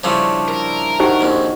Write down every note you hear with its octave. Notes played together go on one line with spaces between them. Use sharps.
C#3 F3 G3 D4 E4 C#6
A#4
D#3 D#4 F#4 G4 C5
A#1 F2